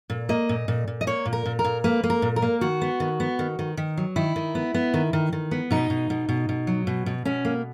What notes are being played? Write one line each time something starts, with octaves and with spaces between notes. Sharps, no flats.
A#2
A#3 D#5
A#2
A#2
A#2
D#5
A#3 C#5
A#2
A#4
A#2
A#4
A#2
A#3 B4
A#3
A#4
A#2
A#4
A#3
D#3 F#4
B3
D#3
B3
D#3
D#3
D#3
F#3
D#3 E4
D#3
B3
B3
D#3
D#3
D#3
B3
B2 D#4
B2
B2
B2
B2
F#3
B2
B2
B2 C#4
A#3